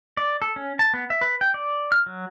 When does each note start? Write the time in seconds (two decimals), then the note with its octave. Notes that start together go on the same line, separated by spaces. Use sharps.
0.17 D5
0.42 A4
0.56 C#4
0.79 A5
0.94 B3
1.10 E5
1.21 B4
1.41 G5
1.54 D5
1.92 F6
2.06 F#3